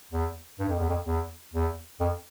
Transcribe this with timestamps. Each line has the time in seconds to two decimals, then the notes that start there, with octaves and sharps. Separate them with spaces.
0.12 E2
0.59 G2
0.69 F2
0.79 E2
0.89 F2
1.06 E2
1.53 E2
2.00 F2